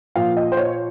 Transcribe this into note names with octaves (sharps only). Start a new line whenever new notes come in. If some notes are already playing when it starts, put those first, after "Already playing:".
A#2 F3 F5
D#5
C5
C#5